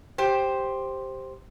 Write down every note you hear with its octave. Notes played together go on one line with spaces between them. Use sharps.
G4 C5